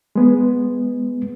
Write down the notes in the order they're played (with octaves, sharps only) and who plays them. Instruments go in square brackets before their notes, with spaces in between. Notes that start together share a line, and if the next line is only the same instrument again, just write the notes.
[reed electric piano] G#3 B3